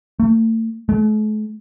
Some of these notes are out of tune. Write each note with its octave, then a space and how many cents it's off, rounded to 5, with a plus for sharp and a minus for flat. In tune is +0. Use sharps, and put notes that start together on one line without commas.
A3 +40
A3 -45